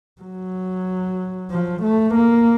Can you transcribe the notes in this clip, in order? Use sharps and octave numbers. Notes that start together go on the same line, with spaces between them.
F#3
F3
A3
A#3